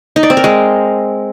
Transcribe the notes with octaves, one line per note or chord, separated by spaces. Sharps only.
D#4
D5
C4
A#4
G#3